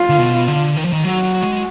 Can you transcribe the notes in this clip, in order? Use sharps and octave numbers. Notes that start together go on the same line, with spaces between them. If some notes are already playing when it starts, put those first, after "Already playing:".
Already playing: F4
D3
B2
D3
D#3
F3
D#3
F#3 F#4
F#3
F#3
G#3